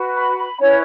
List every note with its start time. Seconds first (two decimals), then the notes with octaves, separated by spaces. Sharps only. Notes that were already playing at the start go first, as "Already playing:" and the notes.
Already playing: F#4 B4
0.14 B5
0.36 B5
0.59 C#4 E4 B4 C#5